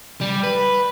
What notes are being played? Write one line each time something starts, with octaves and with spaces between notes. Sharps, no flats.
G3
B4